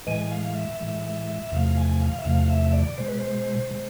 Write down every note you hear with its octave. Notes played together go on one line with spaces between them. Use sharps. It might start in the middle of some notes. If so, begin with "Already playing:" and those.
A2 E3 G#3 G#5
F5
E5
A2 E3 G#3
E2 C3 F3 A3 F5
G#5
F5
E5
E2 C3 F3 A3 F5
E5
D5
B2 G#3 C5
B4
C5
B2 G#3